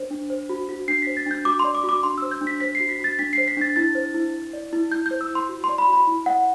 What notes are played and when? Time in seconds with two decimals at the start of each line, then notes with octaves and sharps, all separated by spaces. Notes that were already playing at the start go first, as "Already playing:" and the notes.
Already playing: D4 C5
0.11 D4
0.30 C5
0.49 F#4
0.69 F#4
0.88 D4 C7
1.02 C5 B6
1.17 A6
1.26 D4 G6
1.45 F#4 D6
1.59 D5 C6
1.75 D6
1.84 F#4
1.89 D6
2.03 D4 C6
2.18 C5 E6
2.31 G6
2.41 D4
2.47 B6
2.60 C5 B6
2.75 C7
2.80 F#4
2.89 B6
2.99 F#4 A6
3.19 D4 B6
3.33 C5 C7
3.48 B6
3.57 D4 A6
3.76 E4 A6
3.95 C5
4.15 E4
4.34 E4
4.53 D5
4.73 E4
4.91 E4 G6
5.06 G6
5.11 C5
5.21 E6
5.30 E4 C6
5.49 F#4
5.64 C6
5.69 D5
5.78 B5
5.88 F#4 B5
6.08 E4
6.26 D5 F#5